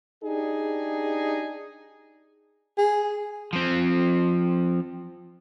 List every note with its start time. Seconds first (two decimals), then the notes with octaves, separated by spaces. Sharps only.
0.23 D4 D#4 G4 G#4
2.78 G#4
3.53 F3 C4